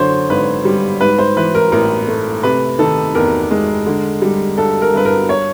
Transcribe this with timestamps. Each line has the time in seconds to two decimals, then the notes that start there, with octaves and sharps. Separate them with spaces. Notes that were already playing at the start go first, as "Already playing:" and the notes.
Already playing: F#2 D3 C5 C#5
0.30 G#1 B4
0.65 G3
1.01 G#2 B4
1.18 C5
1.36 E3 B4
1.55 A#4
1.72 A1 A#4
2.08 A3
2.43 C3 B4
2.79 D#3 A4
3.15 E2 A#4
3.51 G#3
3.87 D3
4.22 G3
4.57 G2 A4
4.82 A#4
4.93 G2 B4
5.05 A#4
5.29 C#5